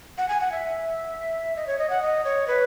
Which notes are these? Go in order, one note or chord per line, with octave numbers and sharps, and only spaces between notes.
F#5
G#5
F#5
E5
D#5
C#5
D#5
F#5
D#5
C#5
B4